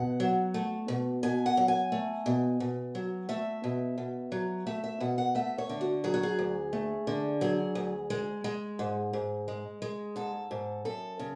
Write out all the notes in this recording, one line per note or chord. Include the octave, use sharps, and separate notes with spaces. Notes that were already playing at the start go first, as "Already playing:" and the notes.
Already playing: B2 F#5
F#3
A3
B2
B2 G#5
F#5
F#3
G#5
A3
B2
B2
F#3
A3 E5
B2
B2
F#3
A3 E5
E5
B2 F#5
F#5
A3 E5
C#5
D3
F#4
F#3 G#4
F#4
G#4
D2
A3
D3
F#3 G#4
D2
G#3
G#3
G#2
G#2
G#3
G#3
G#2 A4
G#2
F#2 A4
C#3